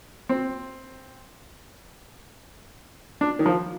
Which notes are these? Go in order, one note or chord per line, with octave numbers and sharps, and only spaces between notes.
C4
D4
D#3
F3